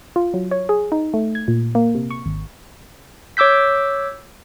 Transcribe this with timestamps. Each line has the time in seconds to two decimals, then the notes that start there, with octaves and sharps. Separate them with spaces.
0.16 F4
0.34 F#3
0.51 C#5
0.69 G#4
0.92 D#4
1.14 A3
1.35 G#6
1.48 A#2
1.75 A#3
1.95 C3
2.10 C#6
2.26 G#1
3.37 C#5 D6 E6 G6 B6